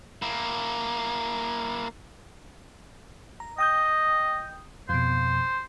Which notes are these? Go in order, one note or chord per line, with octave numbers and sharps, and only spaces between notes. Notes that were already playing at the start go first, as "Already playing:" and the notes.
A#3 E4
A#5
D#5 G5 D#6 G6
F2 B2 C5